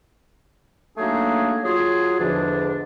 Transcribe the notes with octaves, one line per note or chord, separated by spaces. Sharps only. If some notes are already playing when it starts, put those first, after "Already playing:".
F#3 A3 A#3 D4 D#4 G#4
F#3 F4 G#4
E2 G#2 D3 F3 D4